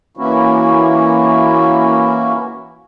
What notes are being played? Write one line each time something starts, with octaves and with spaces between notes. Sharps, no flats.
E3 A#3 C#4 E4 F#4